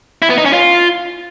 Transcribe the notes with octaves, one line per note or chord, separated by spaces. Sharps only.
E4
B3
D#4
C#4
F4